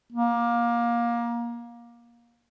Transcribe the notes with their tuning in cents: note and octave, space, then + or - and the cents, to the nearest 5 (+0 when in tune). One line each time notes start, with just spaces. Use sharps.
A#3 +20